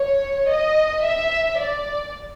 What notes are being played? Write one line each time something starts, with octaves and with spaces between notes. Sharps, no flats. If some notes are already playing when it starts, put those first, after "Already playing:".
Already playing: C#5
D#5
E5
D5